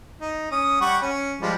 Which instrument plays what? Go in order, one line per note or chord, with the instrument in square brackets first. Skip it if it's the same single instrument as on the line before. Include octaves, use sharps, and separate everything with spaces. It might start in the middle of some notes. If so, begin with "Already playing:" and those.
[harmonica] D#4
C#4 D#6
G3 F#5 C#6
C#4
F3 G3 G#3